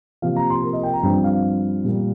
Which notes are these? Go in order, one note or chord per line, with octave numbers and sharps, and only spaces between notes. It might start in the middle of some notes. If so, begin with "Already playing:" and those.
C3 F3 A#3 F5
A#5
C6
A#4
D#5
G5
A#5
G2 F3 C4 G5
F5
A#2 G3 A#3